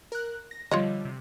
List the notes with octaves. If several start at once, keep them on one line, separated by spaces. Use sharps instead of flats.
A#4 F#6
A#6
D3 F3 G3 F4 C#5 D#5
C3